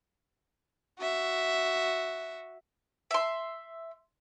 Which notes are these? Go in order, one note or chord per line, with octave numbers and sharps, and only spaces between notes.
F#4 E5
E5 C6